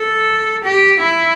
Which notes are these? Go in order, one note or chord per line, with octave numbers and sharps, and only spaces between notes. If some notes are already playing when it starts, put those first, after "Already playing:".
Already playing: A4
G4
E4